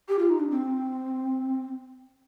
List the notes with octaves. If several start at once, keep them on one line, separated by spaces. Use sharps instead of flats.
G4
F4
D#4
D4
C4